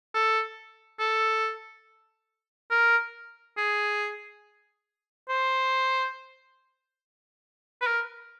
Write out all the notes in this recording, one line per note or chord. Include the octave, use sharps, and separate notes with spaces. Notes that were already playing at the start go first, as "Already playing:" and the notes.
A4
A4
A#4
G#4
C5
B4
A#4